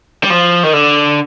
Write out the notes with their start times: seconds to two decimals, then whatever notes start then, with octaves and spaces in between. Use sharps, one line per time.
0.23 G3
0.30 F3
0.63 D#3
0.73 D3